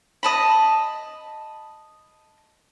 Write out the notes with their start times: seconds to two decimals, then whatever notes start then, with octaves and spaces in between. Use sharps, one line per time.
0.23 D#5 A5 B5